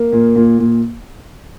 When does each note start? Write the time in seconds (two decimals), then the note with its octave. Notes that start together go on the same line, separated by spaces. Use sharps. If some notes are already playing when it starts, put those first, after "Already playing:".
Already playing: A#3
0.12 A#2
0.36 A#2
0.59 A#2